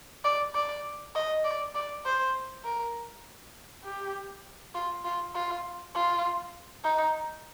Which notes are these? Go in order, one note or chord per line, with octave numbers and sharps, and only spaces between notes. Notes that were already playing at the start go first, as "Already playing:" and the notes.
D5
D5
D#5
D5
D5
C5
A#4
G4
F4
F4
F4
F4
D#4